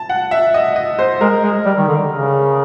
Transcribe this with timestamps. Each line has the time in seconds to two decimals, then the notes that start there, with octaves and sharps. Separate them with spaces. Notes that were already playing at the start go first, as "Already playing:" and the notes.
Already playing: A5
0.09 F#5
0.31 E5
0.54 D#5
0.76 D#5
0.99 C5
1.21 G#3 A#4
1.43 G#3
1.65 G3
1.78 D#3
1.88 D3
2.10 C#3